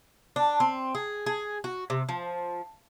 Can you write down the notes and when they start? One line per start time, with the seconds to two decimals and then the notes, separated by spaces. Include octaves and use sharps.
0.36 D4
0.60 C4
0.95 G#4
1.26 G#4
1.64 F#4
1.90 C3
2.09 F3